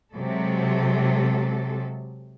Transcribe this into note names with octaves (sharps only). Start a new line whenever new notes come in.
C3 F#3 G#3 A4